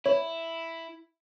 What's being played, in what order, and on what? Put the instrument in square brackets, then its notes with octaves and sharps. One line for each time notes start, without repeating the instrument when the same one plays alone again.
[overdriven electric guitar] E4 [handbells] C#5